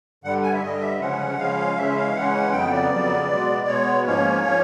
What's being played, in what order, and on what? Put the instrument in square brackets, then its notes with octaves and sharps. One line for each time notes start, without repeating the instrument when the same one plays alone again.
[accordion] G2 D3 G3 F#5
G#5
E5
G2 D3 G3 D#5
E5
C#3 F3 G#3 C#4 F#5
C#3 F3 G#3 C#4 F5
C#3 E3 G#3 C#4 E5
F5
C#3 E3 G#3 C#4 F#5
F2 C#3 F#3 B3 G5
D5
F2 C#3 F#3 B3
B2 G#3 B3
B2 G#3 B3 C#5
G#2 F3 A#3 C#4 C#5
F3 A#3 C#4